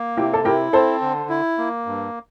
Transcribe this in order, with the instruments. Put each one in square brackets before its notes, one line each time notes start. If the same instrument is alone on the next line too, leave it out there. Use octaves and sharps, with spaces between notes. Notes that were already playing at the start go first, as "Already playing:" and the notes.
Already playing: [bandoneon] A#3
[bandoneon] C3 [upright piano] E4 G4
[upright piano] A4
[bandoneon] E4 [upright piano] G4 A#4
[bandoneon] C4 [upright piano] A4 C5
[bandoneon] D3
E4
A#3
G2